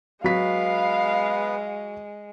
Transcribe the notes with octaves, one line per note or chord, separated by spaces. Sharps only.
F#3 G#3 B3 B4 F5 B6